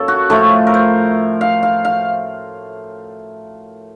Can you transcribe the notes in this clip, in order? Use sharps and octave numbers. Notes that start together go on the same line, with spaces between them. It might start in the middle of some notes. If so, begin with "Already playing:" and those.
Already playing: F#2 A#3 A4 C#5
F#4
A2 F3 A3 A4
A#4
C5
F5
F5
F5